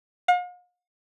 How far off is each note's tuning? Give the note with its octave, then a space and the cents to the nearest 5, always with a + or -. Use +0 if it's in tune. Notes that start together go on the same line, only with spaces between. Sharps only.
F5 +45